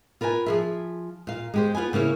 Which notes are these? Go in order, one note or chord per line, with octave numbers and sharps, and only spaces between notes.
F4 A#4 B4 E5 G#5
F3 G#4 E5
A#2 F5
G#3 G4 C5
B3 F4 B4 G#5
C#3 A#3 E4 C#5